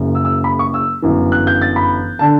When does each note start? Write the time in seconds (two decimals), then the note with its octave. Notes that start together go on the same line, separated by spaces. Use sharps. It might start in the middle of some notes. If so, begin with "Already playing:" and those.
Already playing: F#1 F#2 C#3
0.15 E6
0.25 E6
0.44 B5
0.59 C#6
0.74 E6
1.02 G1 F#2 E3
1.32 F#6
1.47 G6
1.62 A6
1.76 B5
2.19 D3 A5